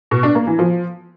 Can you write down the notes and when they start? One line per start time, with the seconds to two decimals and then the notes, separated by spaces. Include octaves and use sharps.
0.11 B2
0.23 D4
0.35 A#3
0.47 E3
0.59 F3